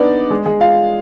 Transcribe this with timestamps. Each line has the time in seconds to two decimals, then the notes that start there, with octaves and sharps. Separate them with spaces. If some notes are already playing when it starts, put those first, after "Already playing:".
Already playing: B3 D4 D#4 B4 D5
0.30 G#3 G#4
0.46 G#3 G#4
0.60 F4 F5